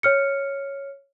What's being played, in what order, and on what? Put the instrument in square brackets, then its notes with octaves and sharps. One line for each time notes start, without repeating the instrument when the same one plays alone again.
[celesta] C#5 F6 C#7